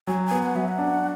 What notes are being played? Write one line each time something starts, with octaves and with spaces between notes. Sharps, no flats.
F#3 G#5
B3 G#5
F#5
F#3 E5
F#5
D4